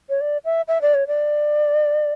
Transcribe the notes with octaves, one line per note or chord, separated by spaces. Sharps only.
C#5
D5
E5
E5
D5
C#5
D5